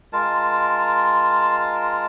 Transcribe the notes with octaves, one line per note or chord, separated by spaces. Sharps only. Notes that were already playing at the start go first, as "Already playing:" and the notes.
G#3 F4 A#4 A5